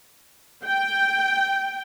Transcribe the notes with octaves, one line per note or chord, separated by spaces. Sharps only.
G5